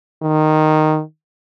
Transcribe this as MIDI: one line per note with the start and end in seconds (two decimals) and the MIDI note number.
0.22 1.01 51